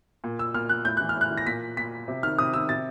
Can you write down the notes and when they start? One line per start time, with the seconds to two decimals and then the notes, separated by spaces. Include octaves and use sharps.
0.24 A#2
0.39 E6
0.54 A#2 F6
0.69 F#6
0.85 A2 G6
0.97 E3 F#6
1.09 F6
1.16 A2
1.21 F#6
1.31 E3
1.38 A#6
1.46 A#2 B6
1.77 A#2 B6
2.08 C3
2.23 D#3 F6
2.38 C3 D#6
2.53 D#3 E6
2.69 C3 A6